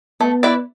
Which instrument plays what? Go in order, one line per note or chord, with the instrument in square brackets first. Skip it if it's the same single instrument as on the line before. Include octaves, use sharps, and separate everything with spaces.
[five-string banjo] A3 [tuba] B3
[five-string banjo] E4 B4 D5